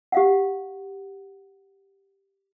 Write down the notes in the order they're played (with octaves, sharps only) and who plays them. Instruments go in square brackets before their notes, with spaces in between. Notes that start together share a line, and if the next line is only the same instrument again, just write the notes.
[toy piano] G4 F5 F#5